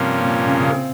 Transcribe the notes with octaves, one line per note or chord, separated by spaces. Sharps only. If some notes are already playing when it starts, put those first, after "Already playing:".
Already playing: G2 C3 F3 A#3 C#4
A#2
C#3
C#3
C4